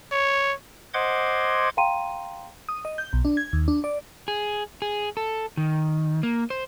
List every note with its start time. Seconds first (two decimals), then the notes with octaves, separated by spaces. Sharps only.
0.12 C#5
0.94 C5 D#5 F#5 C6 D6 G#6
1.77 F5 G5 A#5 C6 D#7
2.69 D#6
2.85 D#5
2.98 G6
3.13 B1
3.25 D4
3.37 G#6
3.53 D#2
3.68 D4
3.84 D5
4.28 G#4
4.82 G#4
5.17 A4
5.57 D#3
6.23 A#3
6.50 C5